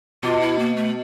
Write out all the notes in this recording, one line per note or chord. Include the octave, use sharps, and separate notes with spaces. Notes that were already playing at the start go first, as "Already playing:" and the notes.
B2 F4
E4
A#3
A3